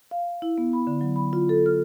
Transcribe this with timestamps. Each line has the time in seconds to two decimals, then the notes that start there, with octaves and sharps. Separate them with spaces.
0.11 F5
0.42 E4
0.58 B3
0.73 B5
0.87 D3
1.01 F#3
1.16 B5
1.33 F4
1.49 A4
1.66 F6